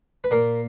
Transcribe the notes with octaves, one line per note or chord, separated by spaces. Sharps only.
B4
A#2 A#3 A#4